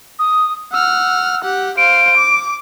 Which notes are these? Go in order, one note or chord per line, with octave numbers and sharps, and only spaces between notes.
D#6
F#5 E6 F6
G4 F#5
C5 F5 D7
D6